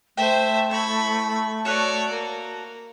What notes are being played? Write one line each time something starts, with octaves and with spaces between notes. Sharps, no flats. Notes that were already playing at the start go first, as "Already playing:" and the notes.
A3 C5 E5 G5
E4 B5 C#6
F#4 A4 B4 C#5 D5
A#3